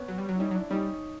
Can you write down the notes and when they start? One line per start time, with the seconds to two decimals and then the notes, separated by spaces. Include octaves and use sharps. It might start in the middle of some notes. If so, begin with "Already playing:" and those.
Already playing: B3 C#4
0.08 F#3
0.18 G3
0.29 F#3
0.35 E4
0.39 G3 C#4 D#4
0.51 F#3
0.55 D4 E4
0.70 G3 C#4 D#4